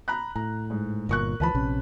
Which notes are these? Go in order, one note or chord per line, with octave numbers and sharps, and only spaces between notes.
A#5 B5 F#6
A2 A#5
G#2
G1 A#2 A#4 C#6 F#6
D2 E3 F3 B4 A5 B5
A#1 C3 C#4